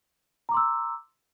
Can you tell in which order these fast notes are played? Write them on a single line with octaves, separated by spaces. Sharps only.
A#5 D6 C6 E6